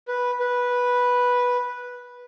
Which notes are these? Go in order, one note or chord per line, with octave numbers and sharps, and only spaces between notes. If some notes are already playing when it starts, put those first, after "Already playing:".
B4
B4